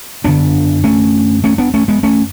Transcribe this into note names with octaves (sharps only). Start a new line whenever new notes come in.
F#2 D3 B3 D4
A3 C#4
A3 C#4
B3 D4
A3 C#4
G#3 B3
A3 C#4